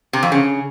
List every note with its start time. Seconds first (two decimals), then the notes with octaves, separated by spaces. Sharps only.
0.13 C3
0.23 F2
0.32 C#3